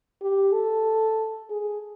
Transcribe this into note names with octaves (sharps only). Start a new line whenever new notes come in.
G4
A4
G#4